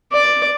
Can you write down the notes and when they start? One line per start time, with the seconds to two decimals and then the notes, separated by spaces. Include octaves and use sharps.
0.13 D5